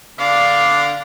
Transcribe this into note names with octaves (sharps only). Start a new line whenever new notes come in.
D3 D4 D5 F5